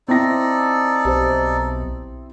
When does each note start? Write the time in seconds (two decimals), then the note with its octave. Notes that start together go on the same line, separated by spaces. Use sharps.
0.08 C4 D#4 E4 A4 D5 A#6
1.05 B1 G4 C5